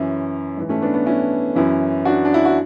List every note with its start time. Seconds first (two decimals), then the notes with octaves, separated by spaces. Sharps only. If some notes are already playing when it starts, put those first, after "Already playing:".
Already playing: F#2 E3 C#4 E4
0.57 G#2 E3
0.69 A3 C#4
0.82 B3 D4
0.94 B3 D4
1.06 C#4 E4
1.55 F#2 E3 C#4 E4
2.05 D4 F#4
2.25 D4
2.34 E4
2.45 F#4